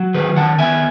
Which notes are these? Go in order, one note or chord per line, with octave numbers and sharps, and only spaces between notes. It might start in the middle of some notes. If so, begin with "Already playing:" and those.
Already playing: F#3
D#3 G#4 B4
D#3 F#5 A5
B3 E5 G#5